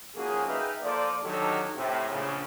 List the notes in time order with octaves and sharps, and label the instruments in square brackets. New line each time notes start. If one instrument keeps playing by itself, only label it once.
[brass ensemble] G#1 F3 A#3 C#4 F#4 G#4
D#4 G#4 B4 E5 F5 G5
F3 A#3 A4 C5 D5
D3 D#3 F#3 D#4 G4 A4
A2 C3
A#1 C#3